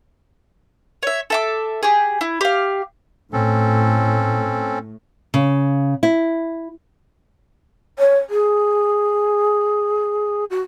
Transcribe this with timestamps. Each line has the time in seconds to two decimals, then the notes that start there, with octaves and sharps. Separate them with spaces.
1.03 C#5 E5
1.30 A4 E5 D6
1.83 G4 G#4
2.21 E4
2.41 G4 F5
3.33 A2 C4 C#4 A4
5.34 C#3
6.03 E4
7.99 C#5
8.30 G#4
10.50 F#4